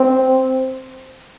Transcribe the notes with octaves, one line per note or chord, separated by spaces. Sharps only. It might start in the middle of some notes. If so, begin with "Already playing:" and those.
Already playing: C4